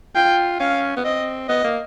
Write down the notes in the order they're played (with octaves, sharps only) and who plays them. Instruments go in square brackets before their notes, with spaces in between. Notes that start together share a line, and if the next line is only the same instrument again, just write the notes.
[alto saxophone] F4 [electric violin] G5
[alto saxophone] C#4 [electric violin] F5
[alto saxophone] B3
[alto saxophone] C4 [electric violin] D#5
[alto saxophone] B3 [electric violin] D#5
[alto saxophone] A#3